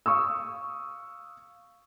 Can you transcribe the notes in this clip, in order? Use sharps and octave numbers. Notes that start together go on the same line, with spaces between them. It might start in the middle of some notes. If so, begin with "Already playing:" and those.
F5 C#6 D#6 E6